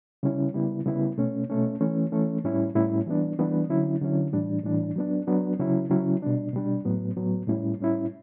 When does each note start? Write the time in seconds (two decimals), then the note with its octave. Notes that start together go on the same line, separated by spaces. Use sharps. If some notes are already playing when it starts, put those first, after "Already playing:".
0.23 C#3 G3 C#4 E4
0.54 C#3 G3 B3 E4
0.86 C#3 G3 B3 E4
1.18 B2 A3 C#4
1.50 B2 A3 C#4
1.81 E3 A3 C#4
2.12 E3 A3 C#4
2.44 A2 G3 C#4 E4
2.75 A2 G3 C#4 E4
3.06 E3 G3 B3 D4
3.39 E3 G3 B3 D4
3.69 D3 F#3 C#4 E4
4.01 D3 F#3 C#4 E4
4.32 A2 E3 G3 D4
4.64 A2 E3 G3 D4
4.96 F#3 B3 D4
5.27 F#3 B3 D4
5.59 C#3 F#3 C#4 E4
5.90 C#3 F#3 C#4 E4
6.22 B2 G3 D4
6.53 B2 G3 D4
6.85 A2 F#3 B3
7.17 A2 F#3 B3
7.48 A2 G3 C#4 E4
7.80 A2 G3 C#4 E4